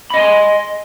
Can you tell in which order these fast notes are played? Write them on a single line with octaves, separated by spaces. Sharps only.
B5 D#5 G#5 C6